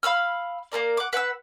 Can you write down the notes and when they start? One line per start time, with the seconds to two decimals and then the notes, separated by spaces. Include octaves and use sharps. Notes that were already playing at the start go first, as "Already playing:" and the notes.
0.03 F5 B5 E6 F6
0.72 A#3 C4 A#4 D5
0.97 F#5 D6
1.13 B4 F#5 D6 E6